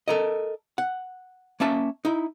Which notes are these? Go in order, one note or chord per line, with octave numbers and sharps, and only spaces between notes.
A4 A#4 D#5
F#5
A#3 C#4 E5 A5
D#4 E4